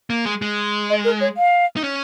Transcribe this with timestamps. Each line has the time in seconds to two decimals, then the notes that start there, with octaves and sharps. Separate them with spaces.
0.10 A#3
0.26 G#3
0.42 G#3
0.90 D#5
1.04 A#4
1.21 C#5
1.37 F5
1.76 D#4
1.84 C#4